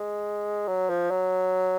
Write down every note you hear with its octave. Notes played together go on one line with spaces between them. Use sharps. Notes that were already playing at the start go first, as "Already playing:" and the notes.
Already playing: G#3
F#3
F3
F#3